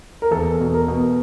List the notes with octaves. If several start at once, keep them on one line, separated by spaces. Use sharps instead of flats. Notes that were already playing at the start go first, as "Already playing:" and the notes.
A#4
E2 A4
B2
A#4
B2